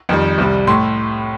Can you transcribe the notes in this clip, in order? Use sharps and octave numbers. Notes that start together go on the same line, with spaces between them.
F2 D#3 G3
C2 C3 G3
A2 A3 C6